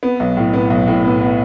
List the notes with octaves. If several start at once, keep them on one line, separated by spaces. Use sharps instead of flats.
B3
B1
A2
B3
B1
A2
B3
B3